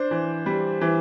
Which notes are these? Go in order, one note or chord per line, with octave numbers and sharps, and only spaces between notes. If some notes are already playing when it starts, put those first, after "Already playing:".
Already playing: D4 C5
E3
G3
E3